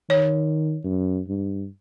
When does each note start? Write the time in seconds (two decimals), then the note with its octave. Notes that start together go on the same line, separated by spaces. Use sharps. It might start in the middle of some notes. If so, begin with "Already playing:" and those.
0.10 D#3 C#5
0.84 F#2
1.28 G2